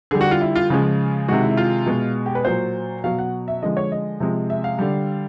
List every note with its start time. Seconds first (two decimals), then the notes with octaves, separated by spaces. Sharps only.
0.11 D3 G3 G#4
0.21 F#4
0.31 F4
0.41 E4
0.55 F4
0.70 C#3 F3 G#3 F4
1.28 C3 D#3 G#3 F#4
1.43 E4
1.57 F4
1.86 B2 G#3
2.26 G4
2.35 B4
2.45 A#2 F#3 C5
3.04 B2 F#3 F5
3.19 F#5
3.48 E5
3.62 D3 F3 G#3 D#5
3.77 C#5
3.92 D#5
4.20 C3 F3 G#3
4.50 E5
4.64 F5
4.79 D3 G3